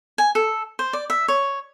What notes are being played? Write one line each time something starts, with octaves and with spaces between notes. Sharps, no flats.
G#5
A4
C5
D5
E5
C#5